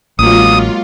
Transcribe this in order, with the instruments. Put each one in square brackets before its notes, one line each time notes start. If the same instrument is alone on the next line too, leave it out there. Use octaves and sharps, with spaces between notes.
[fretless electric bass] A1 [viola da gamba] F#3 G#3 A#3 [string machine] F4 [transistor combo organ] D#6